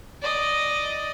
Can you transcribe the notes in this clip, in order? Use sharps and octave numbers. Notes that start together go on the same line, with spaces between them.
D5 D#5